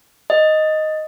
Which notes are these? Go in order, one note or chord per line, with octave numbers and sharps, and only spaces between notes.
D#5